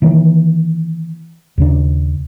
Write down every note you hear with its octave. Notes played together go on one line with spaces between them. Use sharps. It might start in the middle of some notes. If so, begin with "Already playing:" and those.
D#3 E3 A#3
D#2 C#3 D4